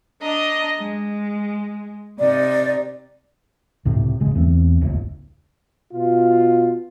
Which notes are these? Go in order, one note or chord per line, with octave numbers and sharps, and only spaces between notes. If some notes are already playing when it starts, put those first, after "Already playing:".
D4 D#5 A#5
G#3
C3 D#4 D5
C#2 A2 C3
E1 C#3 G#3
E2 A3 C4
D#1 G#1 C#2
B2 F4